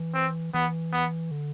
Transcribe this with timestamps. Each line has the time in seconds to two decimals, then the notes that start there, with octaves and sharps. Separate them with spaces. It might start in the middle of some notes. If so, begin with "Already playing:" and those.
Already playing: E3
0.15 C4
0.54 E3 B3
0.93 B3
1.31 D3